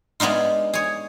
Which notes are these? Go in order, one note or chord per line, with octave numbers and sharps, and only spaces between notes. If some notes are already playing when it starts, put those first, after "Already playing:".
G#3 B3 D4 D#4 F4
G#4 C#5